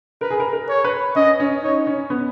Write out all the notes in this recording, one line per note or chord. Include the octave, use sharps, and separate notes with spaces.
A#4 B4
G#4
A#4
A#4
C#5
B4
C#4 D#5
C#4
D#4 C#5
C#4
B3